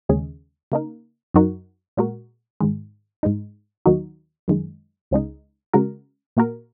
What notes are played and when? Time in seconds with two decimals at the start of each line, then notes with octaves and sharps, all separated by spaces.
0.09 D#2 C#3 G#3 C#4 G#4
0.72 C#3 A#3 D#4 A#4
1.34 F#2 F#3 D#4 F#4 A#4
1.97 A#2 G#3 F#4 A#4
2.61 G#2 D#3 G#3
3.23 G#2 G#3 D#4
3.86 D#2 D#3 F#3 D#4 F#4
4.48 F#2 D#3 G#3
5.11 C#2 C#3 G#3 D#4
5.73 C#3 G#3 F#4 A#4
6.37 A#2 A#3 F#4 A#4